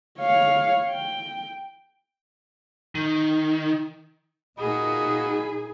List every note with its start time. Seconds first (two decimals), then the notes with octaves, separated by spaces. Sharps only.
0.19 C#5 F5
0.89 G5
2.95 D#3
4.59 A#2 A#3 D#4 F#4 G#4 D#5 B5